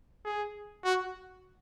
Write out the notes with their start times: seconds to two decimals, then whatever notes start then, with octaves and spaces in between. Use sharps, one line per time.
0.25 G#4
0.84 F#4